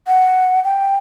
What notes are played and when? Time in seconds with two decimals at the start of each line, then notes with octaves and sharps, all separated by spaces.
0.07 F#5
0.64 G5